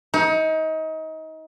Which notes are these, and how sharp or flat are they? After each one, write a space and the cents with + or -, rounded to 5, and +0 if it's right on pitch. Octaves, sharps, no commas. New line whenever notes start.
D#4 +30